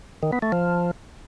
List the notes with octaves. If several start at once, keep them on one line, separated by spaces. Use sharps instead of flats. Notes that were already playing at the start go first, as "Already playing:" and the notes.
D#3
B3
A3
F3